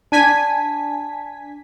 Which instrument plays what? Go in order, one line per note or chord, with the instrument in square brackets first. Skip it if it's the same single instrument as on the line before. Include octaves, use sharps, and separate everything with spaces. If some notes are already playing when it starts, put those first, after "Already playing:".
[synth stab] D4 G#5 B6 [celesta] A5 G#6